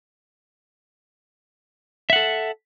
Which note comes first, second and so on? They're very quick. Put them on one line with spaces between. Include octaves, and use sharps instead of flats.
E5 F#5 A4